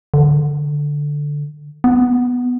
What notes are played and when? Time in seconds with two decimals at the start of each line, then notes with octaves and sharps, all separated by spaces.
0.14 D3
1.84 B3